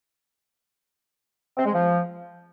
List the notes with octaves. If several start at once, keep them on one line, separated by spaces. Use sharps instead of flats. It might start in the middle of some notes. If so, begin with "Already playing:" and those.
C4
G#3
F3